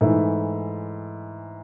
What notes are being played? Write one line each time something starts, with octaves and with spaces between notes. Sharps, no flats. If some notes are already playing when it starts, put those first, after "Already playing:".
G#2 E3 A3 E4